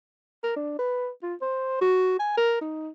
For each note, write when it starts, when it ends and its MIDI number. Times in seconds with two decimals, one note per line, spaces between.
0.44 0.53 70
0.57 0.74 62
0.79 1.09 71
1.23 1.34 65
1.42 1.78 72
1.81 2.17 66
2.20 2.36 80
2.37 2.56 70
2.61 2.89 63